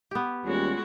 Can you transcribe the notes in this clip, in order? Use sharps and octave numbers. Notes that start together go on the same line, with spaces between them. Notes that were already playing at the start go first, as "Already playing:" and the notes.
B3 G4
D#2 G3 G#3 C#4 F4 F#4